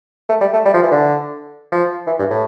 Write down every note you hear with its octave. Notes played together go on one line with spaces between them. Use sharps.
A3
G3
A3
G3
F3
E3
D3
F3
E3
G2
A2